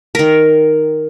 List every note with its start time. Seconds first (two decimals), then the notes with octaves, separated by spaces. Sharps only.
0.15 D#3 A#4